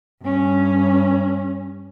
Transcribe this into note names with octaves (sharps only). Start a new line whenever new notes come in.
G2 C#4